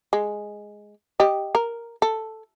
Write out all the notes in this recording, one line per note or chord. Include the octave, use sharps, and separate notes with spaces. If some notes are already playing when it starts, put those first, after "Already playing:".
G#3
G4 D#5
A#4
A4